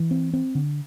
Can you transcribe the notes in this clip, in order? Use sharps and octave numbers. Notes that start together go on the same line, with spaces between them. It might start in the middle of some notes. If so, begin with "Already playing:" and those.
Already playing: E3
C4
C4
D3